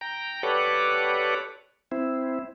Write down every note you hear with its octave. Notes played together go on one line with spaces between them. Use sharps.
G5 A#5
G4 A4 B4 C#5 D5 F#5
C4 E4